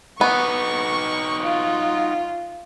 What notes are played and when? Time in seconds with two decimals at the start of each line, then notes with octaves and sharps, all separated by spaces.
0.21 B3 D#4 F#4 C#6
1.45 F4